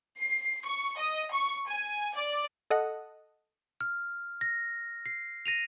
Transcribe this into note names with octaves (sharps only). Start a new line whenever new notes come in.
C7
C#6
D#5
C#6
G#5
D5
A4 D#5 F#5
F6
A#6
C7
A#6 D#7 F7